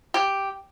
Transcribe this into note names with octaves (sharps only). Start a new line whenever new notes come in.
G4